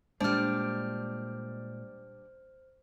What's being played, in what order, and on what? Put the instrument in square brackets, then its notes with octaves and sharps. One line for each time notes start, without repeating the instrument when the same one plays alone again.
[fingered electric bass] A#2 G#3 A#3 [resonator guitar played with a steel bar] G3 D4 [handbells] C5 F6